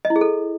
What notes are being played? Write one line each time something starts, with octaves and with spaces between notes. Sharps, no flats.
D#5
E4
G#4
A4